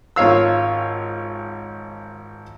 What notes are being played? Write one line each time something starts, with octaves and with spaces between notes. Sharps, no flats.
G#1 F4 C#5 F5 E6